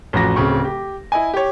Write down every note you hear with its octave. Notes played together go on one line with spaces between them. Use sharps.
A1 F2 F#4 A#6
D1 C#3 C4 C#6
G4
E4 D#5 G#5
G4 C#5